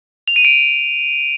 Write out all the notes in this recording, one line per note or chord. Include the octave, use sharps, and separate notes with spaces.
F7
D#7
D7